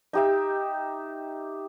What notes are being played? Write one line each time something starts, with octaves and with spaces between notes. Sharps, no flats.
D#4 G4 E5